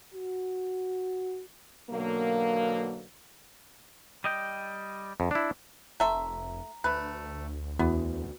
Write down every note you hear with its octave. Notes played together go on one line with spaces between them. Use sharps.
F#4
B1 B2 D3 F#3 A#3
G3 D#5 G5
F2
D4 E4
F1 A3 E5 A#5 C6
D2 A3 B4
E2 B3 F#4